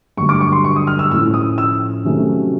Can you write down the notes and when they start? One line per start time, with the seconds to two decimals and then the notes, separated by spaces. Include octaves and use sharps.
0.17 G2 D3 F#3 A3 C#6
0.29 D6
0.41 C#6
0.52 C6
0.64 C#6
0.76 D#6
0.87 F6
0.99 E6
1.11 A2 F3 A3 C#4 E4 E6
1.34 D#6
1.58 E6
2.04 C3 D#3 F#3 A3 C#4